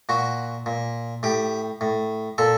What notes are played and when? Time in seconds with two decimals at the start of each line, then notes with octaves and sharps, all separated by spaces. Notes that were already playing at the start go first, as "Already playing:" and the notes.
0.09 A#2 F#4
0.66 A#2
1.23 A2 G4
1.81 A2
2.38 A#2 A4